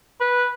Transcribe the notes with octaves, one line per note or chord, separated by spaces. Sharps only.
B4